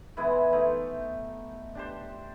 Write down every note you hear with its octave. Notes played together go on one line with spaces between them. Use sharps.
E3 G#3 B3 E4
A3 D#4
D4 G4 C5